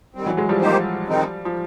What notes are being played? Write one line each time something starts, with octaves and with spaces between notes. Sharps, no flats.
D#3 G3 C4
E3 F#3
F#3 G#3
F3 G3
A#3 D#4 G4 C5
D#3 G#3 C4 D#4
F3